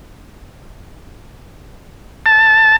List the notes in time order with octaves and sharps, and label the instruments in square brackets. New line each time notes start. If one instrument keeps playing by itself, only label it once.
[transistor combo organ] A5